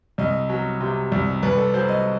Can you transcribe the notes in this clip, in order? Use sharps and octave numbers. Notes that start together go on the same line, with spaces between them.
C2 D#5
F#3
C3
C2
C2 B4
A4
F#3 C5
D#5